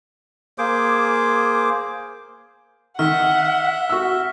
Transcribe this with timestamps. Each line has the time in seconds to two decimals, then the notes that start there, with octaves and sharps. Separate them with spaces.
0.58 A#3 G#4 C5 D6
2.99 D#3 E5 F#5 F6 B6
3.90 F#4 E6